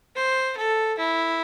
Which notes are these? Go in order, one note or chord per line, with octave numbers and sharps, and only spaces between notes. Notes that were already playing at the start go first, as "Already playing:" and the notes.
C5
A4
E4